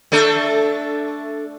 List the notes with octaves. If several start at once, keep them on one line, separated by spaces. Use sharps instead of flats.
A3 D4 A4